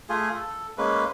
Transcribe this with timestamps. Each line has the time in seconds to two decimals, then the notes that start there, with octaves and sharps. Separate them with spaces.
0.09 A3 F4 G#4
0.32 A4
0.78 G#3 A#3 C#4 B4